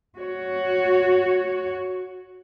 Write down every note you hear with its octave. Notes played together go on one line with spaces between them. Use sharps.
F#4 C#5